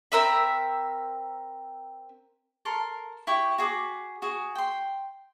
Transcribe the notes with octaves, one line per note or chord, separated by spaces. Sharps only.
C4 A#4 E5 B5
A4 A#4 C6
E4 G4 G5 C#6
F#4 G#4 B5 D6
F#4 G#4
G5 C6